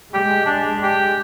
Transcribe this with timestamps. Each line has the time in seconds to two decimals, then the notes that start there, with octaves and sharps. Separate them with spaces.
0.14 G#3 G4
0.46 D4
0.82 G4